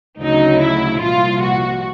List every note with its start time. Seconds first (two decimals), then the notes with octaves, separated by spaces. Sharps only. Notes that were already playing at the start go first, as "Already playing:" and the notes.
0.20 D2 C#3 F#3 D#4
0.60 E4
1.00 C2 A#2 F3 F4
1.41 F#4